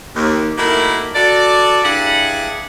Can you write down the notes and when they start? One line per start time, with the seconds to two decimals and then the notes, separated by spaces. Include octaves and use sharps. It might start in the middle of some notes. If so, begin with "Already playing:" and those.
0.15 D#2
0.57 D#3 F#3 A3 A#3 E4
1.15 F#4 A4 D5
1.83 G2 D4 E4 G#4 F#5